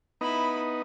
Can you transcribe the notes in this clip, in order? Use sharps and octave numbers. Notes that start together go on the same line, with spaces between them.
B3 D#4 E4 B5